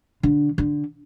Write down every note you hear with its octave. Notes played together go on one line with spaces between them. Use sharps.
D3
D3